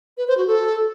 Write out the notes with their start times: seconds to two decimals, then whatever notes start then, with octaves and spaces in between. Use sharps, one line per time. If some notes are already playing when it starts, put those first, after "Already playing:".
0.18 B4
0.28 C5
0.38 F#4
0.47 A4